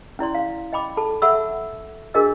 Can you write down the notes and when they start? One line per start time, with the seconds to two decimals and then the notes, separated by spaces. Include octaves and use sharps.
0.19 C#4 E4 D5 C6
0.35 F5
0.73 D#5 G5 B5 D6
0.97 A4 A5 B5
1.22 A4 E5 F#5 B5 C#6 E6
2.14 D4 F#4 G#4 A#4 D#5 E6